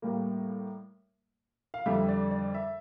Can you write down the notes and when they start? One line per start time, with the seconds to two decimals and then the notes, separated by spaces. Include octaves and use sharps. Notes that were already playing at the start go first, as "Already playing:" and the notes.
0.02 A2 G3 A#3
1.74 F5
1.86 F2 D3 G3 E5
2.09 D5
2.31 D5
2.54 E5